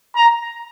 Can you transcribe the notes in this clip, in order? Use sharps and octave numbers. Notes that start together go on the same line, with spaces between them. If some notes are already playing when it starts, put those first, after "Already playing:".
A#5